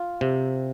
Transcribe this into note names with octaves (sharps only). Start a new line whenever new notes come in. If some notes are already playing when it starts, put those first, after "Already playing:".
Already playing: F4
C3